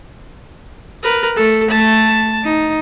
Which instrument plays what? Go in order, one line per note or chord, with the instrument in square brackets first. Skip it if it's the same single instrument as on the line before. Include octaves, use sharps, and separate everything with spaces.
[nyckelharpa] A#4 B4
[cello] A3 [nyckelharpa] A4
[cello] A3 [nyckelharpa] A5
[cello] D#4